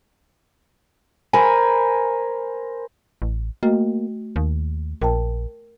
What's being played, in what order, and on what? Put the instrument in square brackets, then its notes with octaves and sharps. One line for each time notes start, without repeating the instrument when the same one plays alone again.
[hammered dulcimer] A#4 C5 G#5 B5
[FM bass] A1
[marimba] A3 F#4 D#5 [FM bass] A#3
[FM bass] D#2
[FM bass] A#1 [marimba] A#4 G5 A5